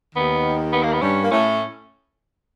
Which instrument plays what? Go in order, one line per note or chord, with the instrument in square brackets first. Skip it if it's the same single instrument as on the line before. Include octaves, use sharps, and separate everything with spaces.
[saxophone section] D#2 D#3 [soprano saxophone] B3
[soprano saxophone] B3
A#3
B3
[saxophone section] G2 G3 [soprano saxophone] C#4
[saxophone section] A#3
[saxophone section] A2 A3 [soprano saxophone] C#4